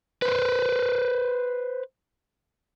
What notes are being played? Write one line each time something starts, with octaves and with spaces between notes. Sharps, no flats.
B4 C5